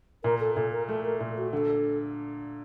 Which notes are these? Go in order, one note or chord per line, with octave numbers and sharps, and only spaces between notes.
A#2 A#4
A4
A#2 A4
A#4
A3 A4
A#4
A#2 A4
F#4
D3 A4